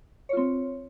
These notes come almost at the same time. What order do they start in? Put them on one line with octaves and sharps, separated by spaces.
C#5 F4 C4